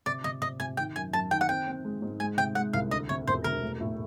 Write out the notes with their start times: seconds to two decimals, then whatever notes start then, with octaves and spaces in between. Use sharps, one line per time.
0.06 C3 D5
0.24 C3 D#5
0.42 C3 D#5
0.60 C3 G#5
0.77 D#3 G5
0.96 F#2 G#5
1.13 F#2 A5
1.31 D#3 G5
1.41 F#5
1.49 C4 G5
1.67 C4
1.85 G#3
2.02 G#2
2.20 G#3 G#5
2.38 C3 G5
2.55 G#3 F#5
2.73 C2 F5
2.91 D2 D#5
3.09 C3 C#5
3.27 E1 C5
3.44 E1 A#4
3.62 A3
3.80 A2